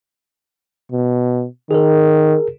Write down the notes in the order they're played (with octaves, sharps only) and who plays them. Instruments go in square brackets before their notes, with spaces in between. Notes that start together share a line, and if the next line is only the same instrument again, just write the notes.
[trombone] B2
[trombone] D#3 [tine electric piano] G#4 A#4